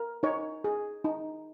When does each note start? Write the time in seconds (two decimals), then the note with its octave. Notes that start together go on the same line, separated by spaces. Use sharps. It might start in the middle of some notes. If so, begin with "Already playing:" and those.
Already playing: A#4
0.23 D#4 C#5
0.64 G#4
1.04 D#4